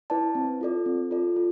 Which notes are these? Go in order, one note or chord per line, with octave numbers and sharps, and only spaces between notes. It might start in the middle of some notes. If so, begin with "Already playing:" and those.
E4 B4 D5 A5
C4
F4 A4 D5
C4
F4 A4 D5
F4